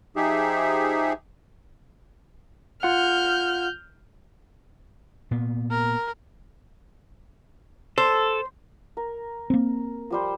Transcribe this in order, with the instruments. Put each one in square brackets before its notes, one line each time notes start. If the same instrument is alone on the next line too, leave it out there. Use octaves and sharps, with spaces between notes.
[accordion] F3 D#4 G4 G#4 E5
[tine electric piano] F4 F#5 [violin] F6 G6
[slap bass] A#2 B3
[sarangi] A#4
[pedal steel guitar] A4 [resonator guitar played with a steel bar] C5
[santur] A#4
[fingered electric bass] A#3 C4
[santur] F3 G3 C5